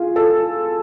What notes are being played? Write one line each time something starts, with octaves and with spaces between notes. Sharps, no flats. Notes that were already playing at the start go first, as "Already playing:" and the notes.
Already playing: F4 G#4
A4